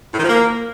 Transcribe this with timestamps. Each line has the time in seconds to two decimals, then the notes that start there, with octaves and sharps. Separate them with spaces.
0.13 A2
0.18 D#3
0.24 F3
0.29 A#3